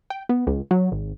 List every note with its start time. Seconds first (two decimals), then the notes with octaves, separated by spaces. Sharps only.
0.10 G5
0.29 B3
0.47 C#2
0.71 F#3
0.92 G#1